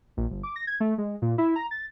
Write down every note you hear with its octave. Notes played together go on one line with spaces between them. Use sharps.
A#1
G1
D6
A#6
G#6
A3
G#3
A#2
E4
A#5
A6